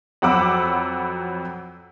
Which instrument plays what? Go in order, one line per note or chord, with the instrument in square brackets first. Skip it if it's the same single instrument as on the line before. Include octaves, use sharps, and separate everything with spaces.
[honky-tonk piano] F2 F#3 F#5 B5 D6 E6